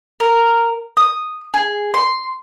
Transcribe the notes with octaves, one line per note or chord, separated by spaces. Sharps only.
A#4
D#6
G#4
C6